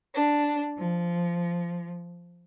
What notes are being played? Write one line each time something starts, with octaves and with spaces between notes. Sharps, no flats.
D4
F3